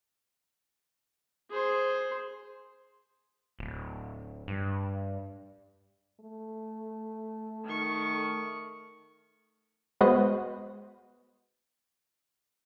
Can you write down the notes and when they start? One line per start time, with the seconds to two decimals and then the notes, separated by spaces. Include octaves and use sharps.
1.51 G#4 C5
3.59 D1
4.48 G2
6.20 A3
7.65 D#3 C#6
10.01 G#3 B3 F#4 B4 C5 D#5